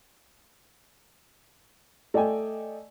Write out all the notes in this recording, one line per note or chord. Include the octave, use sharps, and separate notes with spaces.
A3 D5 D#5 G5 G#5